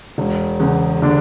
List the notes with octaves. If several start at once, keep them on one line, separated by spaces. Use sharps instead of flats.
E1
E2 C#3
D3 D4